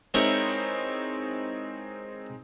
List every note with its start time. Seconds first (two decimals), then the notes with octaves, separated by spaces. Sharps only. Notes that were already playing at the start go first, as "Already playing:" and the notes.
0.14 G#3 C4 D#4 E4 A#4 C#5